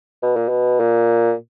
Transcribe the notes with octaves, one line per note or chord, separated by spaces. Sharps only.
B2
A#2
B2
A#2